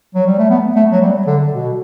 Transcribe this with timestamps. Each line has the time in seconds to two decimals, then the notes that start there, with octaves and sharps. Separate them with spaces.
0.15 F#3
0.27 G3
0.38 A3
0.50 B3
0.76 A3
0.92 F#3
1.02 G3
1.27 D3
1.53 B2